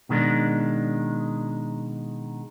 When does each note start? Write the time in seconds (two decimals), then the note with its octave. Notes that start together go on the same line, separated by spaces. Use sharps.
0.09 B2 D#3 G#3 D4